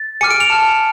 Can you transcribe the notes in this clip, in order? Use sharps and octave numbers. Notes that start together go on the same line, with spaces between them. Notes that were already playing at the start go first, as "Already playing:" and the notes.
Already playing: A6
G#5 D6 F6 C#7
D7
F7
A5 F6